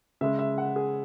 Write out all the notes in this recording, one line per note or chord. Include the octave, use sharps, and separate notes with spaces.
C#3 G#3 E5
E5
F#5
G#4